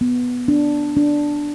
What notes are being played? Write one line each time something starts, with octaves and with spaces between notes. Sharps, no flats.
B3
D4
D4